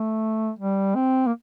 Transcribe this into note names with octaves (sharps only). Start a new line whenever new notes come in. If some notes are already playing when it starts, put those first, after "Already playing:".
Already playing: A3
G3
C4
A#3